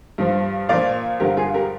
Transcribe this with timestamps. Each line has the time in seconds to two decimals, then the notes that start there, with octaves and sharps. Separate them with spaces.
0.18 G2 F3
0.69 A#2 F3 D5 F5
1.20 G2 D3 F3 G4 A#4
1.37 F4 G#4
1.54 G4 A#4